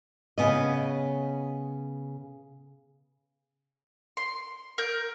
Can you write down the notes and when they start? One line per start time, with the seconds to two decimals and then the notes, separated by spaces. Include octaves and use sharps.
0.38 C#3 B3 D#5
4.17 C6
4.78 A#4 G6